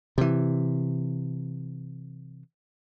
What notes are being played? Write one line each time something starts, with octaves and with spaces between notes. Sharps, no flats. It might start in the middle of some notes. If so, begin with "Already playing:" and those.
C3 E3